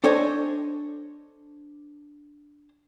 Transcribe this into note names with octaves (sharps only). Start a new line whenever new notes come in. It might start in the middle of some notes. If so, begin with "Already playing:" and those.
D4 A4 C5 C#5 D#5 G#5